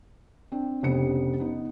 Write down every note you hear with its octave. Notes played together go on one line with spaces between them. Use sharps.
C4 D4
F1 C#3 B3 D4 G4 C#7
B3 D#4